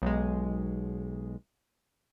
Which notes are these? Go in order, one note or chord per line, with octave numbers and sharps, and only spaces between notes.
B1 G#3